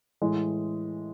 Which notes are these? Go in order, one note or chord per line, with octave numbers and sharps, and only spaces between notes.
A2 E3 G#3